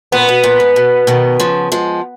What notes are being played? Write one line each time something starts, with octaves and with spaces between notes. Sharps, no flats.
A#2 B3
B2
A#2
G#2
B2
B2 D#3
C#3 F3
F3 G#3